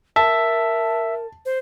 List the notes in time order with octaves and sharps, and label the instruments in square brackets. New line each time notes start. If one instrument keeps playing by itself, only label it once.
[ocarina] A#4 [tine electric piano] E5 [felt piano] A5
[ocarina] C5